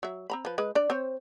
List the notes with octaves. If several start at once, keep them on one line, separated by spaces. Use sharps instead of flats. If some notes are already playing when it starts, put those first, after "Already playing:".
F#3 E5
C4 A#5 B5
F3 B4
G#3 B4
D4 D5
C4 C5 C#5